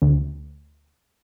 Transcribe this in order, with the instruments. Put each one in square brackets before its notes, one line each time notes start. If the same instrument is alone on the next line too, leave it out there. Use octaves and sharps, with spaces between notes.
[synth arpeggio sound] D2